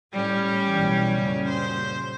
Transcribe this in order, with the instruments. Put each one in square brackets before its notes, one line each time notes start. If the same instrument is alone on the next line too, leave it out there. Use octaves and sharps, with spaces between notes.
[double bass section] A2 [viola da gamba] G3 C#4
[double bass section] B1 E3
F#2 A#2 C#3
[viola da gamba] C5